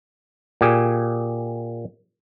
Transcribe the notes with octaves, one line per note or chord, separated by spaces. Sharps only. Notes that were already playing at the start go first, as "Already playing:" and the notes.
A#2 G4 G#4